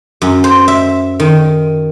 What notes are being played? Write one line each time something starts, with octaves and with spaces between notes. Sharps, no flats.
F#2
C5
E5
D#3